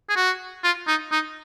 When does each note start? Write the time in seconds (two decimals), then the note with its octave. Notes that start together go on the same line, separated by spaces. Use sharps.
0.09 G#4
0.16 F#4
0.64 F4
0.87 D#4
1.12 D#4